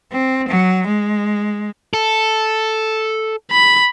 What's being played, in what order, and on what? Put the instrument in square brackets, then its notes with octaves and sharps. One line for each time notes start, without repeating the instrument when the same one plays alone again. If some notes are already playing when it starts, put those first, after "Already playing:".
[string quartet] C4
F#3
G#3
[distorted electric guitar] A4
[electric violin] B5